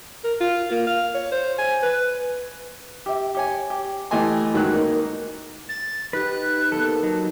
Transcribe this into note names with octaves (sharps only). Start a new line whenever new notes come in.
A#4
F4
A#3
F5
C#5
C5
G#5
B4
G4 E5
G4 C#5 G#5
G4
E3 A3 G4 D#5 G#5 C6
F#2 D#3 F#3 G#3 F#6
A#3 D#4
A6
D#4 G4 B4 F#6
A#3 B3 A4
F#3 D#4 A5